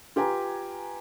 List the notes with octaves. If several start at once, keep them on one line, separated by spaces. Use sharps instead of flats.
F4 G4 B4 G#5 A#5